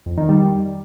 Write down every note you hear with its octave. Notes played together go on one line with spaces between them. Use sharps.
F2
D#3
G3